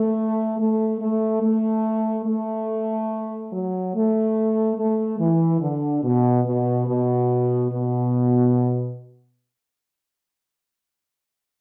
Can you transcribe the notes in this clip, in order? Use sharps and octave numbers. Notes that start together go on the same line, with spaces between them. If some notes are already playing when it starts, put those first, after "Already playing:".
Already playing: A3
A3
A3
A3
A3
F#3
A3
A3
E3
D3
B2
B2
B2
B2